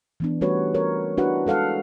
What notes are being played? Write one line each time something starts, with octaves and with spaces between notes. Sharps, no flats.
E3 B3 D4
G3 A3 C#4 F#4 B4 C#5
A#4 C#5
D4 E4 F#4 B4 F#5
G#3 A4 F5 F#5